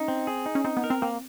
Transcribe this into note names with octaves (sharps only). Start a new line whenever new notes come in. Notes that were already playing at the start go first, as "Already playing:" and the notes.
Already playing: C#4 D#4
C4
G#4
D#4
C#4
C4 D#4
B3
A#4
C4
A#3 C4